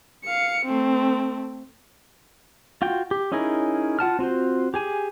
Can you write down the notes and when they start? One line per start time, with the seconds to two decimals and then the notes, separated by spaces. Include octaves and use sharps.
0.24 F5 C#7
0.66 A3 C4
2.82 F4 F#4 G5
3.11 G4
3.32 C#4 D#4 E4 G#4 A#4
3.99 F4 F#5 A5 F6
4.19 C4 F4 F#4 C5
4.74 G4 G#4 G#5